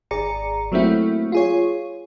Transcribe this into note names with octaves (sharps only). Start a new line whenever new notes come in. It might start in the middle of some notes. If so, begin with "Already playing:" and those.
G#1 G#4 D5 A#5 C#7
F#3 A3 A#3 C4 E4 F#4
F4 G#4 C#5